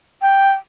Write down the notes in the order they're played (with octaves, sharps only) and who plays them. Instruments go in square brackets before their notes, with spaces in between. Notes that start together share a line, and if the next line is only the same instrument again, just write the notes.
[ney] G5